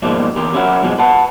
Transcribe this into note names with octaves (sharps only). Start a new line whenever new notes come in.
G#2 B2 F3 G3 G#3 A#3
E2 G4 A#4
C#4 E4 F#4 A#4
G2 B2 F3 G#3
B4 F#5 A5